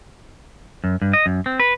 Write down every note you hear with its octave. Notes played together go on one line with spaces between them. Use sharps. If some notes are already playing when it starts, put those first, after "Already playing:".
F#2
G2
D#5
F#2
C4
B4